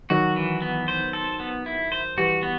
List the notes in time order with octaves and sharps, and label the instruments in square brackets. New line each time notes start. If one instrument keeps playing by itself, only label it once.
[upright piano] D#3 F#3 [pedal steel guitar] F#4
[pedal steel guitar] E3
B3
C5
A4
B3
E4
C5
[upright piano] E3 G3 [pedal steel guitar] F#4
[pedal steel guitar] B3